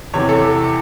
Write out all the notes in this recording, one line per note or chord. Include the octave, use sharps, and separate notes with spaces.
E2 C3 E3 C#5
A4